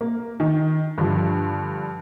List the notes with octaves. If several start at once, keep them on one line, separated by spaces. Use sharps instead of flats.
A#3
D#3
G2 D3 F3